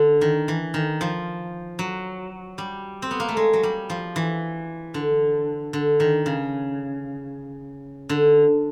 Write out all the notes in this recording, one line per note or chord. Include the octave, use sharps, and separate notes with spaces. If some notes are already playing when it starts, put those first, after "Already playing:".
Already playing: D3
D#3
E3
D#3
F3
F#3
G3
C4
B3
A#3
A3
G#3
F#3
G3
F3
E3
D3
D3
D#3
C#3
D3